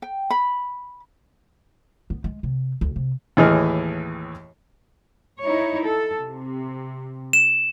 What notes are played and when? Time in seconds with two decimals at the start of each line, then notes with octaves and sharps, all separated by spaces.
0.02 G5
0.30 B5
2.10 B3
2.24 G#3
2.43 C3
2.81 D2
2.96 C3
3.37 D#2 A2 E3 G#4 D#5 F6
5.41 D#4 E4 C#5
5.85 A4
6.20 C3
7.33 E7